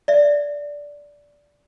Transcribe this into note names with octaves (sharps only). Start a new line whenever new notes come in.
D5 E5